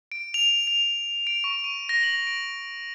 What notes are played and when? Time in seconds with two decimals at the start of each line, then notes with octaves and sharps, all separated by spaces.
0.12 D7
0.34 F7
0.67 F7
1.27 D7
1.44 C#6
1.64 D#7
1.89 A#6
2.03 F#7
2.27 D7